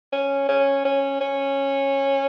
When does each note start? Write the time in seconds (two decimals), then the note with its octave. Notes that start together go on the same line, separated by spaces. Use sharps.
0.12 C#4
0.48 C#4
0.85 C#4
1.21 C#4